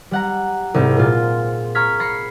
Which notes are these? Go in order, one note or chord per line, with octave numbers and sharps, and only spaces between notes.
G3 F#5 A#5
C2 G#2 C4
A#2 G#3 F4
A#5 C#6 F6 G#6 B6
B5 A#6 C7 C#7